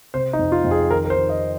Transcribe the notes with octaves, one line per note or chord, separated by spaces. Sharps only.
C3 C5
D#4
F2
F4
F2
G#4
D#3 A#4
A#4
C5
D#3
D#5